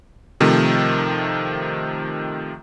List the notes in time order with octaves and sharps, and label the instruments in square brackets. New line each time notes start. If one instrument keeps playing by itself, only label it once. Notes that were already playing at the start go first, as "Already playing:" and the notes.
[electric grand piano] C3 D#3 F3 A3